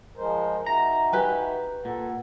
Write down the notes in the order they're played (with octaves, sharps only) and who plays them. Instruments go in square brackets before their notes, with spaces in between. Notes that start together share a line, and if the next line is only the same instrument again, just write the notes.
[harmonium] F3 G#3 C5 [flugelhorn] A#4
[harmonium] D#4 F#4 [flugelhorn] E5 [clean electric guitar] A#5
[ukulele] G4 B4 G#5
[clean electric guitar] A#2 [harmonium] A4 [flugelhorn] F#5